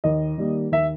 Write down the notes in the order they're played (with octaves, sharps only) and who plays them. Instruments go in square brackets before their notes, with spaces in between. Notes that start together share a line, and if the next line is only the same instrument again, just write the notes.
[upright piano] D#2 D#5
D#3 G3 A#3
D#2 E5